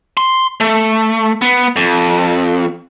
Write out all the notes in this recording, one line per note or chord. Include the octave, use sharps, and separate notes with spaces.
C6
A3
B3
F2